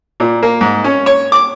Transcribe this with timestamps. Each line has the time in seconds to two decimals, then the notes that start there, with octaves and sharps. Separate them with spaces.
0.20 A#2
0.43 A#3
0.61 G#2
0.84 C#4
1.06 C#5
1.32 D6